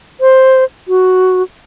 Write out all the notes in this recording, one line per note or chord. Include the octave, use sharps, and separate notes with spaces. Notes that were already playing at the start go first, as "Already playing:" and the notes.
C5
F#4